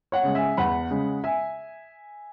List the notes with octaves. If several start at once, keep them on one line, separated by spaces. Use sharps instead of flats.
C#5 F#5
C#3 G#3
E5 G#5
E2 F#5 B5
C#3 G#3
E5 G#5